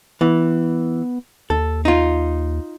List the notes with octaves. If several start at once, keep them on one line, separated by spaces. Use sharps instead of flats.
E3 B3
D#2 A4
D#4 F4